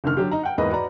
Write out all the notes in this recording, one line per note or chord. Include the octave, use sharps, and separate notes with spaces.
F#1 D3 D#3 F6
D3 F#3 G4
D#4 A#5
F#5 G5
E2 G#2 E3 A#3 B4 D#5
F#4 B4 D5 A#5